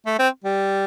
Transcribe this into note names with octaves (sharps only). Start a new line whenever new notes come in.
A3
C4
G3